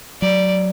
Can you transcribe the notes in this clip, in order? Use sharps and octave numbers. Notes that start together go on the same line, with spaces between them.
F#3 D5